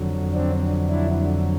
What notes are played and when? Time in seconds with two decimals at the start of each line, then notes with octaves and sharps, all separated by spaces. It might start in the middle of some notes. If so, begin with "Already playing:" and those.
Already playing: F2 D3 F#3
0.34 C4 D4
0.90 D4 E4